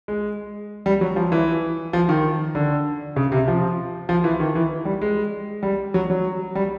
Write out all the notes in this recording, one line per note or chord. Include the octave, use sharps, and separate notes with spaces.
G#3
G3
F#3
F3
E3
F3
D#3
D3
C#3
C3
F3
F3
E3
D#3
E3
G3
G#3
G3
F#3
F#3
G3